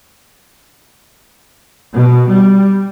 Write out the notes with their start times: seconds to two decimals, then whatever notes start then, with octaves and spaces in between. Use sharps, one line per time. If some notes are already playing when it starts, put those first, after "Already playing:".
1.94 B2
2.28 G3